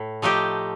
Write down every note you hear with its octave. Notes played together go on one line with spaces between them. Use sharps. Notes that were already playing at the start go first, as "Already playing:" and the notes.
Already playing: A2
F3 A3 D#4 G4